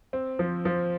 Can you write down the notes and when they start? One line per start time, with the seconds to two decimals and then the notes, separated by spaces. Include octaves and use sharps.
0.13 C4
0.39 F3
0.65 F3